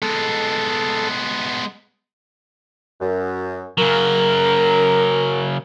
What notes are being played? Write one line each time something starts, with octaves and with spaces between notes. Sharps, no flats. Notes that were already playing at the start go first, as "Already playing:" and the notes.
G#3 B3 A4
F#2
C#3 F#3 A#4